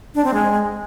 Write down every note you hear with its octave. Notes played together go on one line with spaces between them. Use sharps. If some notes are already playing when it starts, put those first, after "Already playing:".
D4
C4
G#3